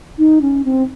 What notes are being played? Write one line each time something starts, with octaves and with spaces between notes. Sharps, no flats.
D#4
C#4
C4